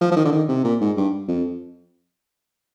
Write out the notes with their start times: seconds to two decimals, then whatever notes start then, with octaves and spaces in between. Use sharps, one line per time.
0.01 F3
0.11 F3
0.16 D#3
0.25 D3
0.32 D#3
0.48 C3
0.64 A#2
0.81 G#2
0.97 G2
1.28 F2